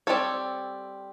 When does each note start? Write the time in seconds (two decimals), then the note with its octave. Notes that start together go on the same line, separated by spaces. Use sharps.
0.07 G3 C4 F4 A4 C#5